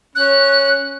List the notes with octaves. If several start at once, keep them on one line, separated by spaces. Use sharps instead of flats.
C#4 F#6